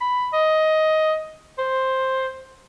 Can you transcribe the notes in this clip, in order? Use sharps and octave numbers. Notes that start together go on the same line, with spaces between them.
B5
D#5
C5